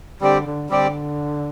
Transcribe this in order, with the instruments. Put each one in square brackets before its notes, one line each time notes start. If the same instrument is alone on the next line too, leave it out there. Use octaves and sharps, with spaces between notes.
[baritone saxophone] D3 [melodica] G3 C4 G4 D5
[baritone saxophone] D3
[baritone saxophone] D3 [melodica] G3 C4 G4 D5